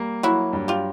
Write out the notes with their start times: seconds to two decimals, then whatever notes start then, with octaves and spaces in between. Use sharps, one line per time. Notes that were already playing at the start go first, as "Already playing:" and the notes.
Already playing: G3 A#3
0.23 F#3 E4 F#4
0.53 G2
0.68 F4 G4